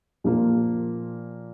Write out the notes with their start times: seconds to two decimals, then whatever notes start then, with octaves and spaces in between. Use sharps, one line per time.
0.24 A#2 F3 A#3